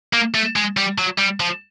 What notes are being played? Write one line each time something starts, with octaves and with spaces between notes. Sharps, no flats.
A#3
A3
G#3
G3
F#3
G3
F3